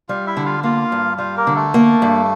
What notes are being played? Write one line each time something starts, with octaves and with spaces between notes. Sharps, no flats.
G3 F4 F5
E4 E5
D3
F4 F5
A#3 F4 F5
G2
G3 F4 F5
A#3 A#4
D3
A3 A4
A#3
G2